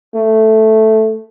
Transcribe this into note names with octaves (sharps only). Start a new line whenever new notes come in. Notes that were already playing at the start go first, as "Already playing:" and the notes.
A3